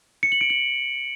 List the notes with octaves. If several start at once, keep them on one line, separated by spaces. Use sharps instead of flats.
C#7
F#7
D7
F#7